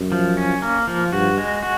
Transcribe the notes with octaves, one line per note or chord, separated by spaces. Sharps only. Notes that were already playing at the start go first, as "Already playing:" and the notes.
Already playing: F#2
F3
C#4
A#3
F3
G2 F#4
G#3
F#4